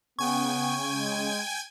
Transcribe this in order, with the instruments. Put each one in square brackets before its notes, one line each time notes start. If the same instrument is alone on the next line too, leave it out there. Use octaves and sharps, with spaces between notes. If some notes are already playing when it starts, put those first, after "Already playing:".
[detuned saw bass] C#3 [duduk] B3 [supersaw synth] G5 G#5 G#6 [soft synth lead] C#6
[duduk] G#3